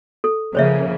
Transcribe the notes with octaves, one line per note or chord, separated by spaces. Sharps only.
A4
C#3 F3 A#3 C5 C#5 E5